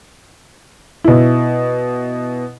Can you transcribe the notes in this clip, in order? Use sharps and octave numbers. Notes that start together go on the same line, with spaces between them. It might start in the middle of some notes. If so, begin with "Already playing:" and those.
B2 E4